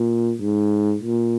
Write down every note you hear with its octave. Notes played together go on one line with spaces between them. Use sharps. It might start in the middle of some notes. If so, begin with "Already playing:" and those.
Already playing: A#2
G#2
A#2